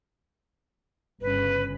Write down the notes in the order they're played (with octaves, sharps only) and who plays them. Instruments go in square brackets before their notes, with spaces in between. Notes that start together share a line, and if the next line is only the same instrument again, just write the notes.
[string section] G1 C#3 [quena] B4